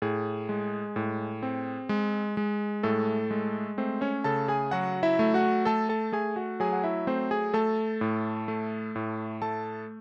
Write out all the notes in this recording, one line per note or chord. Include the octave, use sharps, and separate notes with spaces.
A2 G#4
G#3
A2
C4
G#3
G#3
A2 A3 A4
G#3
A3 C4 C5
C#4 C#5
C#3 A4 A5
G#4 G#5
F#3 F#4 F#5
E4 E5
A3
F#4 F#5
A3 A4 A5
A4 A5
A3 G#4 G#5
F#4 F#5
F#3 G#4 G#5
F#5
E4 E5
A3 C4 C5
G#4 G#5
A3 A4 A5
A2
A3
A2
A3 A4 A5